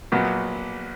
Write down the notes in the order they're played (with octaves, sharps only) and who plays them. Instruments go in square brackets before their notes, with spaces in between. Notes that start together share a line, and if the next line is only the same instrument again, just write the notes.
[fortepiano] A#1 A#2 F#3 B3